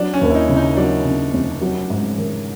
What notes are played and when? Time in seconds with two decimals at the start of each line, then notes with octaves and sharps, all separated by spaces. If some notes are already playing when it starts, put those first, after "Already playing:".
Already playing: F#3 D4
0.14 C#4
0.21 D#2
0.30 E4
0.35 D#4
0.49 C#3
0.56 D#4
0.77 F#3 D4
1.05 C#3
1.33 F1
1.62 F#3
1.90 G#2
2.18 D#3